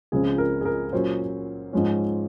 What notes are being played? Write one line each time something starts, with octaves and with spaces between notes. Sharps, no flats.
C#2 C#3 F3 G#3 C4 G#4
A#4
G#4
A#4
A#2 F#3 C#4 C5
G#2 F3 G#3 C#4